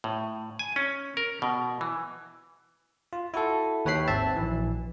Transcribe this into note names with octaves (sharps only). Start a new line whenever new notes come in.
A2
G#5
C#4
A#4
B2
E3
F4
E4 F#4 A4
D#2 B4 C#5 G5 B5 C7
G#1 C4 E5 A5
A#1 E3